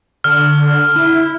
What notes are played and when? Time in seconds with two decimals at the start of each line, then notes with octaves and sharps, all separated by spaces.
0.24 D3 F6
0.96 E4